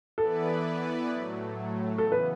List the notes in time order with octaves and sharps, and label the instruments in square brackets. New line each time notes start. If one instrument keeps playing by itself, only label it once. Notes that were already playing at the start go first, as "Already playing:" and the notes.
[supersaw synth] E3 B3 E4 B4 D5 [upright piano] A4
[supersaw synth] A2 F#3 A3
[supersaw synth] C#3 E3 B3 [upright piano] A4
[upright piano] B4